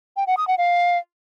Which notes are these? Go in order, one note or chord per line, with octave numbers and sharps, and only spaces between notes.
G5
F#5
D#6
F#5
F5